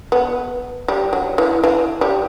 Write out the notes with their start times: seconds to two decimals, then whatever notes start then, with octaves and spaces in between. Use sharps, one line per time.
0.12 B3
0.88 G3
1.13 F#3
1.38 E3
1.64 E3
2.01 G3